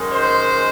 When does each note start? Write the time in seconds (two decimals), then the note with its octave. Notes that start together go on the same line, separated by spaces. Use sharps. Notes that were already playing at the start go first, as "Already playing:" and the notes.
Already playing: F#2 D#3 G#3
0.12 C5